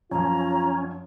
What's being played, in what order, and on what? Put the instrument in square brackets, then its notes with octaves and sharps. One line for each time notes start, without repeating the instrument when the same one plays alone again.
[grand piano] F#2 F3 [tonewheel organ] C#4 [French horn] F4 [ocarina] A#5